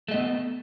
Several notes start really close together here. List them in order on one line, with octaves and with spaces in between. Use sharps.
A3 D#5 B3